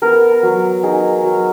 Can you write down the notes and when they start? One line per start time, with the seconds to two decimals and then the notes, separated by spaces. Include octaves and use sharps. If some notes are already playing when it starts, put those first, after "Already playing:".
0.02 B3 A#4
0.43 F#3
0.83 D#4 G#4
1.24 F#3